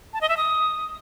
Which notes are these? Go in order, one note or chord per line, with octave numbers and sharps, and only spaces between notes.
A5
D#5
E5
D#6